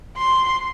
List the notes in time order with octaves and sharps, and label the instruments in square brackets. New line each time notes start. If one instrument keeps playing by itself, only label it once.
[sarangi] C6